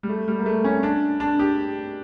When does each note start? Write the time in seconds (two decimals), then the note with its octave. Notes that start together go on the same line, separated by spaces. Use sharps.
0.03 G3
0.09 A3
0.28 G3
0.39 A#3
0.46 A3
0.64 C#4
0.83 D4
1.20 D4
1.39 G4